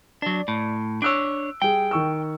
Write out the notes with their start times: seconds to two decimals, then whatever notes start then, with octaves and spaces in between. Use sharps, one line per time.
0.22 F#3 D4 D5
0.48 A2
1.02 D4 C#5 E6 F#6 D7
1.62 G3 G#4 G5
1.91 D#3 C#6 E6